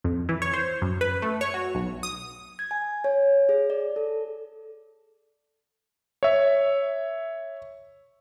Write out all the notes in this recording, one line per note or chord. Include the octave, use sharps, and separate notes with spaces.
F2
E3
C#5
C5
F#2
B4
A3
C#5
F#4
B1
D#6
G#6
G#5
C#5
G#4
D5
A4
C#5 E5